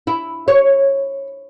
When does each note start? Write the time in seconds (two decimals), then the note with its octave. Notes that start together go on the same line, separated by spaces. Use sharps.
0.07 E4
0.48 C#5